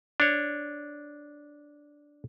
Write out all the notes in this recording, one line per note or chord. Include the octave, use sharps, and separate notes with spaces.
D4 C#5